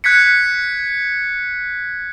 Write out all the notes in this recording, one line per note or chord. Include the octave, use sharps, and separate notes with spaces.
F#6 G#6 B6 C#7